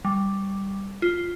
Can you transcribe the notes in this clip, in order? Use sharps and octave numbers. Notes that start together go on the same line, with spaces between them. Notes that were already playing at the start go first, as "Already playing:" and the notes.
G3
F4